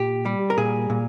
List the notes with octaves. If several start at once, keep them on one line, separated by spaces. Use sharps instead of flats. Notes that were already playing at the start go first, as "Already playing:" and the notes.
Already playing: A#2 G4
G3
A#4
A#2 G#4
A#2